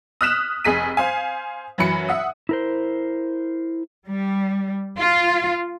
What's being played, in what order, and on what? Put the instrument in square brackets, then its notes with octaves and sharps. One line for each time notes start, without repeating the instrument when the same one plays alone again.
[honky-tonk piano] D#6 F6 F#6 B6 E7
F1 G#4 B6 D#7
C5 F5 G#5
F#2 E3 F#3 B5 C#7
E5 F#5 D#6
[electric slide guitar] E4 A#4 C5
[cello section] G3
F4